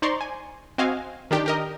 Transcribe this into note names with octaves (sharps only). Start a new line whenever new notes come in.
D#4 C5 D5 A#5 C6 C#6
G#5
C4 F#4 D#5 F5 G#5
D#3 D4 G4
G4 A#4 D#5